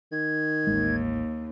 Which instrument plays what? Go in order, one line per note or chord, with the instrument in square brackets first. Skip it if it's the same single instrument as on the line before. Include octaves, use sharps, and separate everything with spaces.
[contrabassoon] D#3 [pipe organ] G#6
[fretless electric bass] A1 G#3 [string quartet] D#2